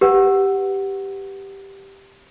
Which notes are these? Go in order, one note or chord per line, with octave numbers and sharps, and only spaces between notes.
G4 B4 F#5